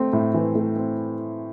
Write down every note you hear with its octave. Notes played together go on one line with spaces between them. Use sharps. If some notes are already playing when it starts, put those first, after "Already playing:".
Already playing: A3 C4
A2
E3
A3
C4